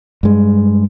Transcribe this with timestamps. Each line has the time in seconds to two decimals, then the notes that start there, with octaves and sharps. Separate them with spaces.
0.23 G2 G#3